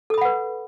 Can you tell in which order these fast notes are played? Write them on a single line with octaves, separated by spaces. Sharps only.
A4 D#6 B5 F#5 B4